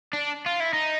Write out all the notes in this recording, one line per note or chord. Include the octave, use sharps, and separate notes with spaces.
D4
F4
E4
D#4